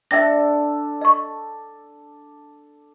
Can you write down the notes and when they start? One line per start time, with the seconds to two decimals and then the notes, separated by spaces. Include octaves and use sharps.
0.11 D4 A4 E5 G5 A#6
1.01 D#5 C#6